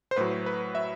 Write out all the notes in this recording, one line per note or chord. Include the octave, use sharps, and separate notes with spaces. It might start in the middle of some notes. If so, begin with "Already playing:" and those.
C5
A2 F#3 B4
B4
E5